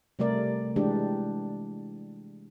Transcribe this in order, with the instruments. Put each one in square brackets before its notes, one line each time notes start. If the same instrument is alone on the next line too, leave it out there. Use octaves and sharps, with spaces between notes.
[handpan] C3 G3 A3 A#4 D5
E3 G#3 D4 G4